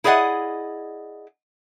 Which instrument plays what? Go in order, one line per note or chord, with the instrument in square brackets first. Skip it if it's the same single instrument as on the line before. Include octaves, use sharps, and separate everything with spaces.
[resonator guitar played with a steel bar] E4 G#4 D5 D#5 F#5